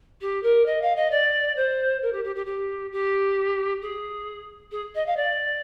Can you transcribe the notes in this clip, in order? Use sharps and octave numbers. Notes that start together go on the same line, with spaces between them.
G4
A#4
D#5
F5
D#5
D5
C5
A#4
G4
G4
G4
G4
G4
G#4
G#4
D#5
F5
D5